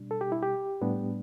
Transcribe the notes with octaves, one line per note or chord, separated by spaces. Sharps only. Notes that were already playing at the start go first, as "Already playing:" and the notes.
Already playing: B2 G3 D4
A4
G4
E4
G4
A2 G3 B3 D4